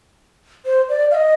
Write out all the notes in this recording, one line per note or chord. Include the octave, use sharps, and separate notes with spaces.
C5
D5
F5
D#5